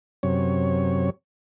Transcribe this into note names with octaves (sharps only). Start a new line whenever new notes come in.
F#2 C3 C#5